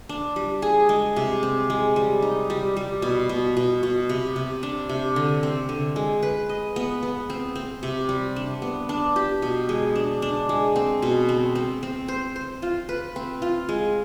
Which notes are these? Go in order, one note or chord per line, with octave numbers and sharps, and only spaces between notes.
D4
G3
G#4
G#3
C3
C4
G#3
G3
D#4
G3
G3
B2
B2
B2
B2
C3
C3
D4
C3
D3
C4
D3
G#3
B4
D#5
B3
B3
C4
C4
C3
G3
D4
B3
D4
G4
B2
G#3
D4
D4
G#3
C4
B2
C4
C4
C4
C5
C5
F4
B4
C4
F4
G#3